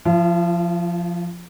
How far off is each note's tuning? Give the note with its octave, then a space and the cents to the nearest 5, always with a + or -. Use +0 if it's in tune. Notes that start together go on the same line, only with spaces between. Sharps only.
F3 +0 F4 -45